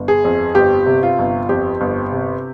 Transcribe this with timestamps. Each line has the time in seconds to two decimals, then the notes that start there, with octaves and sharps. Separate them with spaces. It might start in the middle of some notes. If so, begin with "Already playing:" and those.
Already playing: G1
0.08 G#4
0.25 F2
0.55 G1 G4
0.86 C3
1.03 F4
1.19 G1
1.49 F2 G4
1.81 G1
2.12 C3